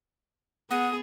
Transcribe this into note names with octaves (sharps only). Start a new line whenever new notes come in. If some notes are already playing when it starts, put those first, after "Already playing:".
B3 G#4 F#5 D#6